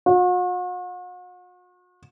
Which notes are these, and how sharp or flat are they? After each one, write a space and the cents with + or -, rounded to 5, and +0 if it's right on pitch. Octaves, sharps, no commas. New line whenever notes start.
F#4 -45